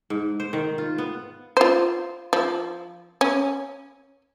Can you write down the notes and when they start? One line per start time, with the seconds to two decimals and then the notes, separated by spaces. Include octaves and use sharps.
0.10 G#2
0.40 C5
0.53 D#3
0.78 F4
0.98 B3
1.57 F4 C5
2.33 F3
3.21 C#4